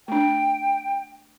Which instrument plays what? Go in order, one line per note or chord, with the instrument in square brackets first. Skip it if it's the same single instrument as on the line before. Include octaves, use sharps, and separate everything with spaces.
[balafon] A3 D4 [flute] G5